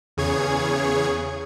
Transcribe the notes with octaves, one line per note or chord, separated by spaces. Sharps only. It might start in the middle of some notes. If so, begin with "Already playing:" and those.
E2 C#3 G#4 C#5 G#6